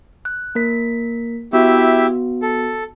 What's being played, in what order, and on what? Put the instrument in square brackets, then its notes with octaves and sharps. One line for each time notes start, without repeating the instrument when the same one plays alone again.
[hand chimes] F#6
A#3 A#4 B6
[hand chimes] B3 F#4 [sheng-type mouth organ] E4 G4 E5
[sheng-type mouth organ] A4